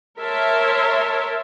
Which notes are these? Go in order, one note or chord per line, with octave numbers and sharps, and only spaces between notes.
A#4 C#5 E5 A5 C6